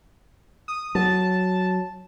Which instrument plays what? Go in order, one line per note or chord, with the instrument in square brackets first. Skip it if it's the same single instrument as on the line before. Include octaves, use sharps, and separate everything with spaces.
[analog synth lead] D#6
[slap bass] F#3 [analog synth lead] A5